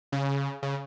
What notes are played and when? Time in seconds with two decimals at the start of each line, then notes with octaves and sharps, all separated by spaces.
0.12 C#3
0.63 C#3